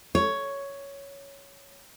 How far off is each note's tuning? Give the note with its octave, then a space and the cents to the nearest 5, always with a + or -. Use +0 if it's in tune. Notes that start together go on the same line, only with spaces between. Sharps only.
C#5 +5